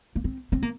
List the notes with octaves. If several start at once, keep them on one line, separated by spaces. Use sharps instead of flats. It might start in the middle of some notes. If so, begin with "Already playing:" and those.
A#3
C4
C4
A#3